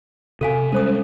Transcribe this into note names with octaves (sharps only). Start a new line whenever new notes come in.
C3 A4 F5 G#5
G3 G#3 C#4 A4 C5 D#6